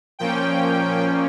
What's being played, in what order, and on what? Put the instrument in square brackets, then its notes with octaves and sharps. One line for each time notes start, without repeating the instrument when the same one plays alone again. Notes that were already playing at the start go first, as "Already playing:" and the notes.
[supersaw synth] A#2 F3 A#3 C#4 G5